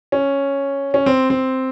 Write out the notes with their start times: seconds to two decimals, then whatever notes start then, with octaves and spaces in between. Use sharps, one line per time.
0.12 C#4
0.94 C#4
1.06 C4
1.30 C4